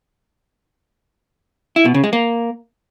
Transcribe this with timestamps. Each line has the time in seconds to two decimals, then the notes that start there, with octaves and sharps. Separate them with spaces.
1.76 E4
1.85 B2
1.94 C#3
2.04 G#3
2.13 A#3